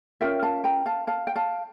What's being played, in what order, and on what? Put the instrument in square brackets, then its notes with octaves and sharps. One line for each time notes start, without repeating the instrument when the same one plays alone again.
[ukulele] C#4 F4 A#4 E5 G5
F5 A5
G5 A#5
F5 A5
F5 A5
G5
F5 A5